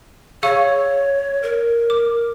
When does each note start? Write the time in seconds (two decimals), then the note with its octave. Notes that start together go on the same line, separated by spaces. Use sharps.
0.43 G#4 C#5 F5 C#6
1.43 A#4
1.90 D6